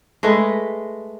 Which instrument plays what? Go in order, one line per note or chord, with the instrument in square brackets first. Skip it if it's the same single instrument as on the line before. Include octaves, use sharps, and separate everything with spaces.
[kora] G#3 A3 B4